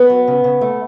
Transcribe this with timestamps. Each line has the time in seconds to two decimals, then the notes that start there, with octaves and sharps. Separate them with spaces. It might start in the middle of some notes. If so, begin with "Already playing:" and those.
Already playing: B3
0.10 F#3
0.27 C#3
0.44 C#3
0.61 A3